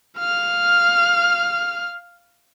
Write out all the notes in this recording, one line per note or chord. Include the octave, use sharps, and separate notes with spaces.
F5 F6